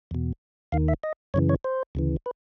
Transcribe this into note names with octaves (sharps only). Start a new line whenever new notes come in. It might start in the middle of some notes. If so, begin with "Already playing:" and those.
E2 B2
D#2 D#3 F5
E5
D#5
F#2 C#3 E3 C#5
C#5
C5
D2 C#3 E3
B4